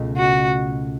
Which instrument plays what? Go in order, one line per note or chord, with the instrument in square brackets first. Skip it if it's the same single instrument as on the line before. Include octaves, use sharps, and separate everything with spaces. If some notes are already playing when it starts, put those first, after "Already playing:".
Already playing: [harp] C#2 B2 A3
[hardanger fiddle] F#4